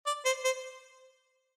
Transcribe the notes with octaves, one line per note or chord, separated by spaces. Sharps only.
D5
C5
C5